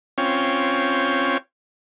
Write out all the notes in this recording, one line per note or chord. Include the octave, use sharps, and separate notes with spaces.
C4 C#4 F4 C#5 G5